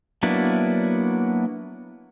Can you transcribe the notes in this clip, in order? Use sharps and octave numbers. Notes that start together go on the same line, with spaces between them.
F#3 A#3 B3 D4 E4